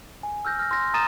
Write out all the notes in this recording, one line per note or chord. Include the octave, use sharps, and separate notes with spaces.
G#5
E6 F6 G6 A#6
F6 A#6
C6 A#6
A#5 D#6 A6 D#7 E7